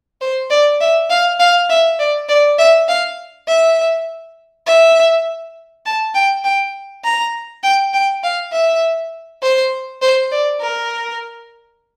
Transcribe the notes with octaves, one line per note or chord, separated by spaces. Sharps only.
C5
D5
E5
F5
F5
E5
D5
D5
E5
F5
E5
E5
A5
G5
G5
A#5
G5
G5
F5
E5
C5
C5
D5
A#4